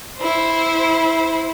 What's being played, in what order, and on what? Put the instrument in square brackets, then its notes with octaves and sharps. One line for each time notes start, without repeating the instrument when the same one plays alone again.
[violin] E4 C5